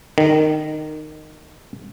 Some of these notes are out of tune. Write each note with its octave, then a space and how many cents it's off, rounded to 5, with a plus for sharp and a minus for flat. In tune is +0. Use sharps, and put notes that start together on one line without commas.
D#3 -15